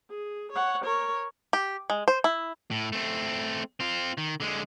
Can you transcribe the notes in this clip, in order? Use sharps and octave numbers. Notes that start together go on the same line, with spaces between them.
G#4
C#5 F#5
A#4 C#5
G4
G#3
C5
E4
A2
A3 C4
C4 F4
D#3
D3 G#3